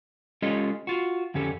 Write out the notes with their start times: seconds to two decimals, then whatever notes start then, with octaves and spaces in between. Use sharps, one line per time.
0.42 G#3 C#4 F4 G4 A4 D#5
0.87 F4 F#4
1.34 F2 D3 C#4 G4 A4